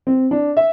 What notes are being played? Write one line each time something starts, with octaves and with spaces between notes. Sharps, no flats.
C4
D4
E5